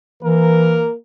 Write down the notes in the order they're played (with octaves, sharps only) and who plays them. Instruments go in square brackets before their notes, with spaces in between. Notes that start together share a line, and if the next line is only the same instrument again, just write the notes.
[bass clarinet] E3 [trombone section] A#3 A#4